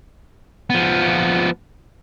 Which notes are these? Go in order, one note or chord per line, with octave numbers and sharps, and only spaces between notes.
F3 B3